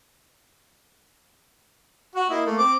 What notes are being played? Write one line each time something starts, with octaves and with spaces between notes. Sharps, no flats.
F#4 F#5
A#3 E4 D#5
A3 A#3
C4 D6